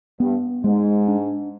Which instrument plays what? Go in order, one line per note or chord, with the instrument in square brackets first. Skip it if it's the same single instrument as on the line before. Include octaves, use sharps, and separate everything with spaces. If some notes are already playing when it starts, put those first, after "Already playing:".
[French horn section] G2 [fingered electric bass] B3
[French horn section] G#2 [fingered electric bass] G#3
[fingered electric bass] D4